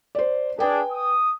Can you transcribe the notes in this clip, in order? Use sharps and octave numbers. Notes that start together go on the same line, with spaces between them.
C5 D5
D4 G#4 B4 G5 G#5
D#6